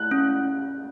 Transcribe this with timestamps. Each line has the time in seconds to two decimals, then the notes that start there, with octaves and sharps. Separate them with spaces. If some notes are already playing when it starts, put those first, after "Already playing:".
Already playing: E4 F#6
0.11 C#4